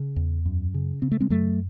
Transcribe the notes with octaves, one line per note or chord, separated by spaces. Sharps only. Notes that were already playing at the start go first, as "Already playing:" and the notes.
Already playing: C#3
E2
F#2
C#3
C#3 C4
A3
G#3 C4
F#2 F#3 A3